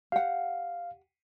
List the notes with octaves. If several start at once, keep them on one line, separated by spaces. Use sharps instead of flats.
G4 F5 F#5